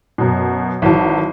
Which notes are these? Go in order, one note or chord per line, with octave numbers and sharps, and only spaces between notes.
F#2 B2
G#1 E3 F#3 A5